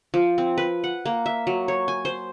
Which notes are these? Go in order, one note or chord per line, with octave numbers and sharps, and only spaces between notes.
F3
C4
B4
F#5
A#3
E5
F#3
C#5
G#5
C5